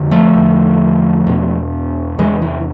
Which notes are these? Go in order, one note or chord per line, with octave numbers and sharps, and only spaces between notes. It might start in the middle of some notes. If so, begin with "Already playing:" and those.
Already playing: F2 D3
F3 A3
E2 D3
E2 B2
E2 C3 E3 G#3
E3